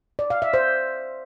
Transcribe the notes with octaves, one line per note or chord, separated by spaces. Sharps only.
D5
F5
E5
C5